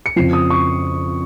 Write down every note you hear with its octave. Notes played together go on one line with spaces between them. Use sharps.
C#7
F2 C#3 F3 C7
D#6
C#6